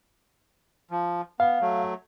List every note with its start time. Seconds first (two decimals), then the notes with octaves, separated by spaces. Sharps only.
0.91 F3
1.40 B3 F5
1.61 F#3 A3